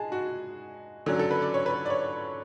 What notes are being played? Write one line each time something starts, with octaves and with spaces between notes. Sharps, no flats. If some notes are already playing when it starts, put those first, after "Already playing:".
Already playing: G#3 G#4 A5
F#4
D3 F#3 C#4
A4
B4
D5
C#5
B4
D5
C#5